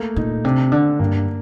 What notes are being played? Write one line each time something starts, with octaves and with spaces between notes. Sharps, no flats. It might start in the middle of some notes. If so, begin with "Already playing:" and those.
Already playing: A3 A#3
A#2 D#4
C3 D4
D3 D4
G2 A#3